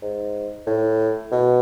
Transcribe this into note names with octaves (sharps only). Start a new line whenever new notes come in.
G#2
A2
B2